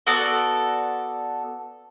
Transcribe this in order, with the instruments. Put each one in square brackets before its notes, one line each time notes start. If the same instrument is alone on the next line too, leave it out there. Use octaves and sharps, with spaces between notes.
[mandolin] B3 F#4 A4 D5